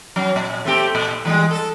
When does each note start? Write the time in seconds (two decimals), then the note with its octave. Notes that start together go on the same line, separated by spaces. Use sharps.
0.16 F#3 C#4
0.36 A#2
0.65 A3 C4 G4
0.95 A#2
1.25 E3 G3 G#3
1.51 A4